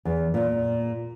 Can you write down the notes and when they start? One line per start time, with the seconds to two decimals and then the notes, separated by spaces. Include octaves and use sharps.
0.05 E2
0.34 A#2